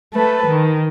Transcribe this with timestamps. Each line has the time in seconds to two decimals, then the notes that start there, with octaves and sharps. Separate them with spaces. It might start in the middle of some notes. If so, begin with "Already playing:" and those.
0.13 A3 A4 B4
0.46 D#3